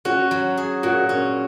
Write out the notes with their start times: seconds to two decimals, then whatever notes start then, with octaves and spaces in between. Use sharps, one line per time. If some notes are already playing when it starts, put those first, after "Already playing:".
0.05 C#4 F#4
0.31 F#3
0.57 G#4
0.83 A#2 F#4
1.09 C#4